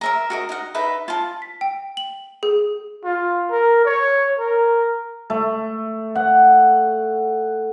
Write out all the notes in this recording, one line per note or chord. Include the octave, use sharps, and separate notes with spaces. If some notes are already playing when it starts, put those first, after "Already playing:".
A#4 E5 A#5
F#4 A#4 D#5
D#4 D#5 F#5
D#4 B4 E5 B5
F4 A5
B6
G5
F#7
G#4
F4
A#4
C#5
A#4
A3
F#5